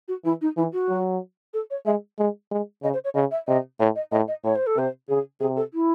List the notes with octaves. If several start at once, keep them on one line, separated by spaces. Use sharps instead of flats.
F#4
E3 E4
D#4
E3 E4
F#4
F#3
A4
C#5
G#3 E5
G#3
G#3
C#3 D#5
C5
C#5
C#3 D#5
E5
C3 D#5
A2 C#5
D#5
A2 D#5
D#5
A2 C#5
C5
A4
C3 C5
C#3 G#4
C3 G#4
A4
E4